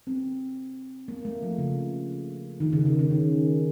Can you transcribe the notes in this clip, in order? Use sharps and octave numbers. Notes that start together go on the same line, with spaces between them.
C4
A#3
A3
F3
C#3
D#3
C#3
C#3
C#3
D#3